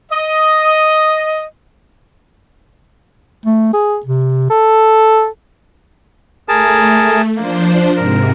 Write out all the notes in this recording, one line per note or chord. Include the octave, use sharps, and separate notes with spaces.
D#5
A3
G#4
C3
A4
A3 G#4 A#4 A5
F3 A#3 D4 C5
G#2 C3 A#4